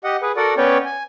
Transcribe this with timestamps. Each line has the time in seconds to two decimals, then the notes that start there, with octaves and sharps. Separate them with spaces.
0.04 G4 D#5 F#5
0.22 G#4 B4
0.37 F#4 A4 A#4 D5 F#5
0.57 B3 C#4 B4 C#5 D5 G5
0.85 G#5